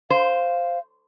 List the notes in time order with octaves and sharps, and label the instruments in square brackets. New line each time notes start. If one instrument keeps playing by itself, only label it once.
[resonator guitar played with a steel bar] C5 [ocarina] F5